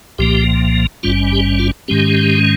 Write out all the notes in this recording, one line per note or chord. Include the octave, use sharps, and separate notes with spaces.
C2 A#2 F3 A#3 G4
G#1 G2 G3 C#4 F4
G4
F4
G#2 D#3 G#3 C#4 G4